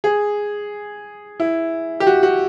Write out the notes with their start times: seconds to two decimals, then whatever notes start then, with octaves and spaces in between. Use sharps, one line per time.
0.04 G#4
1.40 E4
2.00 G4
2.07 F#4
2.23 F#4